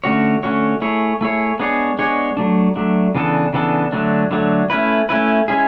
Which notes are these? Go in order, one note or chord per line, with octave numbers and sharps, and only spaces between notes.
D3 A3 C#4 F#4 C#5
D3 A3 C#4 F#4 C#5
A3 E4 G#4 C#5
A3 E4 G#4 C#5
G#3 B3 D4 G#4 C#5
G#3 B3 D4 G#4 C#5
F#3 A3 D4
F#3 A3 D4
C#3 E3 B3 D4 A4
C#3 E3 B3 D4 A4
D3 F#3 A3 D4
D3 F#3 A3 D4
A3 C#4 E4 B4
A3 C#4 E4 B4
G#3 C#4 E4 G#4